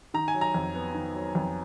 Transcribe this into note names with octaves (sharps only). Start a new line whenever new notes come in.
D#3 A#5
G#5
F#3
A#5
F2
B3
D#3
F#3
F2